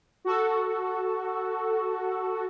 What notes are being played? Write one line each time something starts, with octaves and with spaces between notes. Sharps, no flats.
F#4 A4